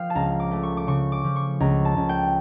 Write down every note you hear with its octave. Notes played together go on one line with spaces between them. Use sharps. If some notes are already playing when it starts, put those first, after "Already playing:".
Already playing: F3 F5 G5
A5
C#2 A#5
D6
A3
C#6
D6
C#3 C#6
D6
F3
C#6
C#2 A#5
A5
C#2
G5